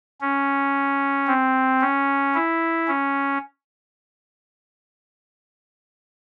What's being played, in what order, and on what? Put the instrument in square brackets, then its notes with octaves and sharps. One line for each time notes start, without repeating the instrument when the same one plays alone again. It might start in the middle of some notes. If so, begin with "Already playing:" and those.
[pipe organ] C#4
C4
C#4
E4
C#4